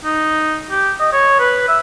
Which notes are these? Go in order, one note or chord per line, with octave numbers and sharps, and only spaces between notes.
D#4
G4
D#5
C#5
B4
E5